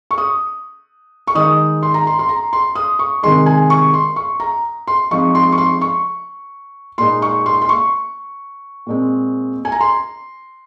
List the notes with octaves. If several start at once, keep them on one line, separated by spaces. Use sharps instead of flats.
C#6
D#6
C#6
D#3 G#3 D#4 D#6
C6
A#5
C6
C6
A#5
C6
D#6
C#6
C3 D#3 G#3 C6
G#5
C#6
C6
C#6
A#5
C6
F3 G#3 C4 D#4 C#6
C6
C#6
C6
C#6
A#2 G#3 D#4 C6
C#6
C6
C6
C#6
A#2 G#3 C4
G#5
A#5
C6